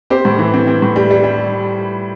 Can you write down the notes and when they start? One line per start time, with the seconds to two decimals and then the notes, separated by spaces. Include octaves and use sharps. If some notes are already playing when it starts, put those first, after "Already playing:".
0.10 C4 G4 C5
0.25 A2
0.39 E3
0.54 C4
0.67 C4
0.82 A2
0.96 G3
1.10 G3
1.24 G3